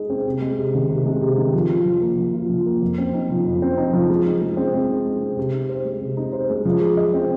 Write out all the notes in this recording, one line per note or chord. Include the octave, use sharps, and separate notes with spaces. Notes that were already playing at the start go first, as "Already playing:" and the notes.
Already playing: G#3 D#4 G#4
C4
C3
G#3
C3
D#3
C3
G#3
C3
D#3
F3
F4
F3
A#3
F3
F4
F3
A#3
F2
C4
D#4
F3
F2
C4
D#4
F3
G#3
D#4
G#3
C4
G#3
D#4
G#3
C4
C3
D#4
C5
G#3
C3
D#4
C5
G#3
F3
G#4
D#5
C4